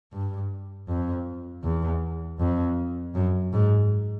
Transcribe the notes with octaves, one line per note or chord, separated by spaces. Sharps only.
G2
F2
E2
F2
F#2
G#2